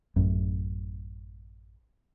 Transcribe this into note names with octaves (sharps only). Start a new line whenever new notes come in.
A1 F#2